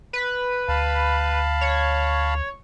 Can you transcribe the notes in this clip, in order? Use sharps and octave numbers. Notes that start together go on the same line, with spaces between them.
B4
D2 F5 A5 B5
C#5